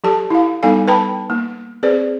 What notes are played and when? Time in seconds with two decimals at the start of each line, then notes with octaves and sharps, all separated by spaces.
0.04 F#3 G4 A4 A5
0.30 E4 F5
0.63 G3 B3 D#4 A4 F5 G#5
0.87 B4 G5 A5 B5
1.30 A#3
1.83 C4 G#4 B4 C5 D5